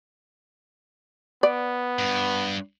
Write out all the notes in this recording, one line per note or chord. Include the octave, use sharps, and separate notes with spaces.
B3 D5
G2